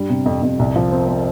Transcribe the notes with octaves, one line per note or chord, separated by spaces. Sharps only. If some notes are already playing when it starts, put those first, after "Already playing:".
Already playing: G2 G3
C3
F2
F2
C2
F3
C4
C4